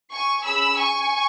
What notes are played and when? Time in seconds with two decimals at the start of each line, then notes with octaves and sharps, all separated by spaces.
0.12 G#5 C#6
0.45 C#4 G#4 B5 E6
0.78 G#5 C#6